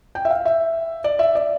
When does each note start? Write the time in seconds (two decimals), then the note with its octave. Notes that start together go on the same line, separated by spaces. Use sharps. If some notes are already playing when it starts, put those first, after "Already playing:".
0.15 G5
0.25 E5
0.30 F5
0.46 E5
1.04 D5
1.19 E5
1.35 D5